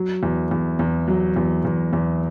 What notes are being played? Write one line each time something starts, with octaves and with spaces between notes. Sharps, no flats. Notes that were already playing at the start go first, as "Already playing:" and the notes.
Already playing: F#3
E2
E2
E2
F#3
E2
E2
E2